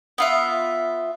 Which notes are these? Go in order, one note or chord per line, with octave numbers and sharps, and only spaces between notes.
B3 F4 E5